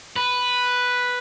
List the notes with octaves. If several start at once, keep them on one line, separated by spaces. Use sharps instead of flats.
B4